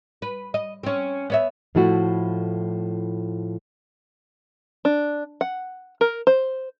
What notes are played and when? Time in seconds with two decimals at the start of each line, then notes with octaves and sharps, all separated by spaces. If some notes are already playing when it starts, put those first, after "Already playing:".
0.22 B4
0.54 D#5
0.83 C4 C#4
1.30 B3 C#5 E5
1.75 A2 F3 A3 E4 F#4
4.85 D4
5.41 F#5
6.01 A#4
6.27 C5